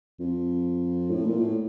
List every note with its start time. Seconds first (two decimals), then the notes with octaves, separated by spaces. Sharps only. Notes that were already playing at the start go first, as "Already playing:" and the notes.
0.20 F2
1.10 A2
1.24 A#2
1.38 A2